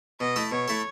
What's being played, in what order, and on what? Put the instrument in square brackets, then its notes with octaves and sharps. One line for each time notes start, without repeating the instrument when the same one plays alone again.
[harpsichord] B2 [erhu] D#5
[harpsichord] A3 E4 A4
[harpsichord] B2 [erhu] C#5
[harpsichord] A3 E4 A4